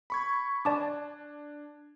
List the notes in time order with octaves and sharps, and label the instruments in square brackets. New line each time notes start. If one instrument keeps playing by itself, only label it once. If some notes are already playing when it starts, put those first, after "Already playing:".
[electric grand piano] B5 C#6 G#6
[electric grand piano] D4 [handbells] D5 A5 D6